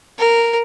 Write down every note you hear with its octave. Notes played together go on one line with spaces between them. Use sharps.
A#4